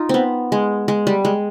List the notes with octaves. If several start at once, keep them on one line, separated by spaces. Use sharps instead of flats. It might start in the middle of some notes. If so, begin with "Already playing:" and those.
Already playing: D#4 F4
B3 C4
G#3
G#3
G3
G#3